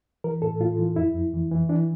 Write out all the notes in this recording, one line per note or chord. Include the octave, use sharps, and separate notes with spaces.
E3 A#4
A2 A4
A2 F4
E3
F2 E4
F2
E3
E3
E3 D4